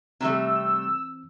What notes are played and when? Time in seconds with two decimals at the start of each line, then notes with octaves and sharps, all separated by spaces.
0.21 C3 E3 G3 A3 C4 E6